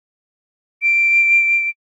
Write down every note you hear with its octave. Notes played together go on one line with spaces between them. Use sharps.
D7